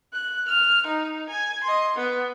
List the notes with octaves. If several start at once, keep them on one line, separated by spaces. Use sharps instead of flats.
F#6
F6
D#4
G#5
D#5 C6
B3